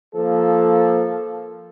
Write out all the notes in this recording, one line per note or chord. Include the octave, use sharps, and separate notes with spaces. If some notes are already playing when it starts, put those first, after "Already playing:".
F3 A#3 A4